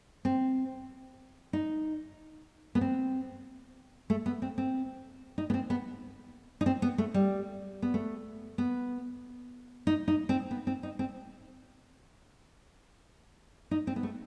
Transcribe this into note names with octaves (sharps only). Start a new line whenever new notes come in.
C4
D#4
B3
C4
A3
B3
C4
C4
D#4
B3
C4
B3
D#4
C4
B3
A3
G3
B3
A3
B3
D#4
D#4
C4
B3
C4
D#4
C4
D#4
C4
B3
A3